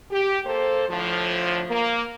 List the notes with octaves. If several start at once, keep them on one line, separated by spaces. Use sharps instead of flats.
G4
A#3 A4 C5
A2 D3 F3
A#3